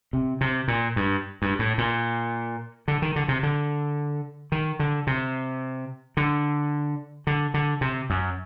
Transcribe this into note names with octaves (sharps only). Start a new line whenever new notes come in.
C3
C3
A#2
G2
G2
A2
A#2
D3
D#3
D3
C3
D3
D#3
D3
C3
D3
D3
D3
C3
F#2